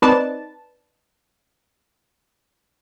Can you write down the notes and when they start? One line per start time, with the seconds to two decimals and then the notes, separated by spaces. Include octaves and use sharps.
0.02 C4 D#4 B4 D5 A5